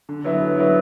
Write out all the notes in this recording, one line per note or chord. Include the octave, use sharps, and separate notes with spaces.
D3
F#3 B3 E4
D3
F#3 B3 E4